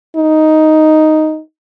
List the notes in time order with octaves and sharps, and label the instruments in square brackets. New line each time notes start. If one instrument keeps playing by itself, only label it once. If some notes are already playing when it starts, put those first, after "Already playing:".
[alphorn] D#4